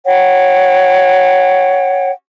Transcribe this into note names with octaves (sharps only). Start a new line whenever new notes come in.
C#5 F#5 G5